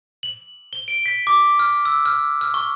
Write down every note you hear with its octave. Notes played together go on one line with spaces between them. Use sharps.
F#7
G7
D7
B6
D6
F6
E6
F6
F6
C#6